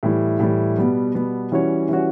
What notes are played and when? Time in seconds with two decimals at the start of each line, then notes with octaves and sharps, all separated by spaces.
0.03 A2 E3 G3
0.39 A2 E3 G3
0.77 B2 G3 B3
1.15 B2 G3 B3
1.52 E3 G3 C#4 F#4 C#5
1.89 E3 G3 C#4 F#4 C#5